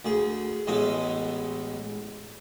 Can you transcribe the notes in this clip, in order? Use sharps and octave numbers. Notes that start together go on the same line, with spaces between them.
D2 G#4
A1 G#3 A3 B3 D#6